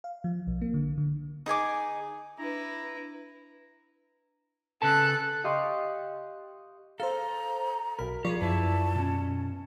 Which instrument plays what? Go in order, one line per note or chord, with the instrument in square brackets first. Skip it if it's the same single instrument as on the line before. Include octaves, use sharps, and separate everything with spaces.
[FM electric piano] F5
F3
B1
A#3
D3
D3
[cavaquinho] D#4 G#4 G#5 D6
[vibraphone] D4 [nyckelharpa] E4 B4 [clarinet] A#5
[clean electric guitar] C#3 B4 A5 [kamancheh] A4 F#6
[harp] G4 D#5 F5 C6 C#6
[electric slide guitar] A4 [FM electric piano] C5 F5 [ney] A#5
[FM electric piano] B1 B5 [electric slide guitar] A#4
[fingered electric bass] F3 [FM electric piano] F4 D5 C#6 [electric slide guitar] G4 G#4
[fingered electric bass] F#2 [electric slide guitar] E4 B4 [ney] A5
[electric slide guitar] B2 C#4